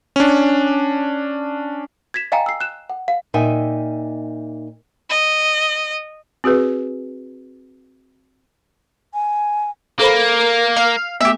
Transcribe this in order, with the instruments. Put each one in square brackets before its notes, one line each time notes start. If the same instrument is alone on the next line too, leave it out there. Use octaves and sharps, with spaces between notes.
[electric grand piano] C#4 D4
[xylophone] G#6 A#6 B6 E7
D#5 F5 G5 G#5 A#5
E6 C7
F#6 E7
F#5
F5
[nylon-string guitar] A#2 D#4 E5 G5 G#5
[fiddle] D#5
[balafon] C4 F#4 G#4 B4
[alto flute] G#5
[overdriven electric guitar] A#3 [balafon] A4 C5 B5 [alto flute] A#4
[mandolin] F5
[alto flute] A3 [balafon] B3 [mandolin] G4 E5